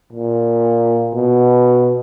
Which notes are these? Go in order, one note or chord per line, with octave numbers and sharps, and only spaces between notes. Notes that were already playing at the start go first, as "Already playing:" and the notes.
A#2
B2